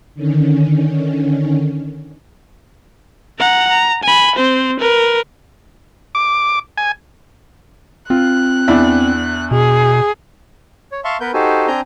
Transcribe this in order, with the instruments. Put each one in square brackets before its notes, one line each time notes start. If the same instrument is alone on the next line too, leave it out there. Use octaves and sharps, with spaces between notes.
[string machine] D3 D#3 C#4
[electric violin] F#5 A#5
A#5
G#5 B5
C4 C5
A#4 B4
[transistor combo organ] D6
G#5
[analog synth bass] C4 [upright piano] F4 [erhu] F#6
[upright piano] E2 D4 E4
[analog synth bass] B2 [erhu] G#4
[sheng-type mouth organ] C#5
E5 F5 A5 C6 C#6
B3 A#4 B4 G6
D#4 F#4 G4 A4 C5 G#5
C4 D4 G#5 A#5 G6